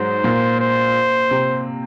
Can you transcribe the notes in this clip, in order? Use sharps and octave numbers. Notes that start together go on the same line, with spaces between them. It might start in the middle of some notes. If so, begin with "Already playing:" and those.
Already playing: G#2 F#3 G#3 C5
A#2 A#3
C5
C3 C4